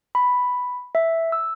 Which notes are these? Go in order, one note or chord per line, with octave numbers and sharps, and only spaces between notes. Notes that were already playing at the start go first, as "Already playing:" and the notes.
B5
E5
E6